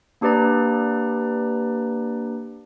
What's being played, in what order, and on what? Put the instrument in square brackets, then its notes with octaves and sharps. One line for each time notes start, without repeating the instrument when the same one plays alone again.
[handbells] A#3 D4 G4 B4 D5 A#5